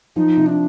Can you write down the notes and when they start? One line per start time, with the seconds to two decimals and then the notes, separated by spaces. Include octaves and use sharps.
0.16 F3 D#4
0.37 C3
0.46 D4